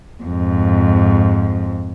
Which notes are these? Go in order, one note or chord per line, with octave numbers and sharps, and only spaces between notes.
F2 G#2